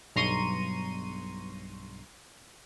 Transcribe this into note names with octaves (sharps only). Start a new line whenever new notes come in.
B1 G2 A#5 C6 C#6 D#7